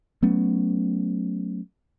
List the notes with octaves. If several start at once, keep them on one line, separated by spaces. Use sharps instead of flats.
F#3 A3 B3 C#4